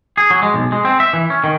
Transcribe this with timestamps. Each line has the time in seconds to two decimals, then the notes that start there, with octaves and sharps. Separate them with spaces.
0.17 G#4
0.30 F#3
0.43 G#3
0.54 B1
0.72 G#3
0.85 C4
1.00 E5
1.13 E3
1.30 C#4
1.44 D#3